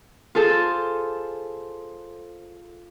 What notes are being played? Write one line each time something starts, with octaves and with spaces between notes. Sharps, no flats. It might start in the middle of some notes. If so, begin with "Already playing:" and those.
F4 G#4 A4 C5